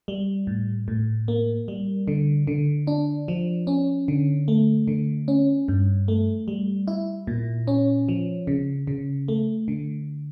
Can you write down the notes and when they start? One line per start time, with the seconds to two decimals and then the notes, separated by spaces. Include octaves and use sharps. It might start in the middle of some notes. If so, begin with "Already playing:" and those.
0.08 G3
0.47 A2
0.88 A2
1.28 A#3
1.68 G3
2.08 D3
2.47 D3
2.87 D4
3.28 F3
3.67 C#4
4.08 D3
4.48 A3
4.88 D3
5.28 C#4
5.68 G2
6.08 A3
6.48 G3
6.88 E4
7.27 A#2
7.68 C#4
8.09 F3
8.47 C#3
8.87 C#3
9.28 A3
9.68 D3